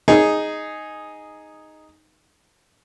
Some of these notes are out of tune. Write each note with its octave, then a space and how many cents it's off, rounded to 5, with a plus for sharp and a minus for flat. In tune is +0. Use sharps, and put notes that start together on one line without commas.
D#4 +0 G#4 +0